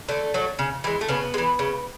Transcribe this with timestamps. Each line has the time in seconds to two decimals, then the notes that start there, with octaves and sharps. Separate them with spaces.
0.09 D3 A3
0.34 F#3 A3
0.59 C#3
0.84 E3 G#3
1.01 A3
1.09 C#3 B3
1.34 G#3
1.38 E3
1.59 C#3